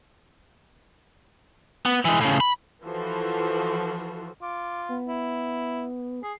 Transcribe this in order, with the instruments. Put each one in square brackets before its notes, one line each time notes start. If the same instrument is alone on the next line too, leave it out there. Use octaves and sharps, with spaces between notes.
[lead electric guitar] B3
E3 G#3
A2 C#3
B5
[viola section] E3 F3 F#4 A4
[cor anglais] F4 [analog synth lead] D6
[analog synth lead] B3
[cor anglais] E4
[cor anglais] G#4 [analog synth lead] C7